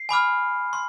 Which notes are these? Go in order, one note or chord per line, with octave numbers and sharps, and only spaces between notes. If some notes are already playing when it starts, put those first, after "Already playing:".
Already playing: C7
G#5 B5 D6 F6
C6